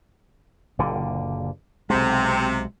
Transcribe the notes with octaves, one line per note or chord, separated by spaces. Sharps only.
F#1 A#2 D3
B1 C3 G#3